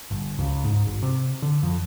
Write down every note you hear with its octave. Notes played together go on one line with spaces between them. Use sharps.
G1
C#2
G#2
G#1
C3
D3
F2